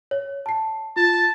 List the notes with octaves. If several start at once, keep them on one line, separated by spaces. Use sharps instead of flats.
C#5
A5 C7
F4 A5